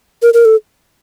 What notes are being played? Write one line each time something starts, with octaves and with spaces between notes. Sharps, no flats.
A#4
A#4
A4